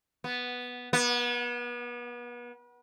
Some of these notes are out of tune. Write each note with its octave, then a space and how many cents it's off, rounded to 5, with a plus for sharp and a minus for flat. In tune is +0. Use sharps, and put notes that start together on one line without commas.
B3 -5
B3 -35